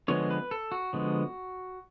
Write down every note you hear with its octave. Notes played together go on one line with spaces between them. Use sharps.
D3 F3 G#3 B3 C#5
B4
A4
F#4
D3 F3 G#3 B3